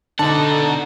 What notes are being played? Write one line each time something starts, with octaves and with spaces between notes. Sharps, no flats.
B2 D3 D#4 F#5 A5